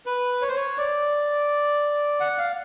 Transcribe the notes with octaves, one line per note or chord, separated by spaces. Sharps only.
B4
C#5
C5
C#5
D5
F#5
F5